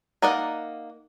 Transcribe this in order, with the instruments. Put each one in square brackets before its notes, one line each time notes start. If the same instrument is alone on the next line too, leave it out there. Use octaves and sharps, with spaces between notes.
[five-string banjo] A#3 D#4 D5 D#5 F#5